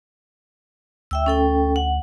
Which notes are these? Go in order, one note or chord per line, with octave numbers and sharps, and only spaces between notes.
D2 E5 G5 E6
C#4 A4 G5
F#5